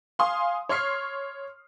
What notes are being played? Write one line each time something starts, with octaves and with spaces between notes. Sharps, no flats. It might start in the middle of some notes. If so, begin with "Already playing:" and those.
F5 G#5 C6 D#6
C#5 C6 C#6 F6 C7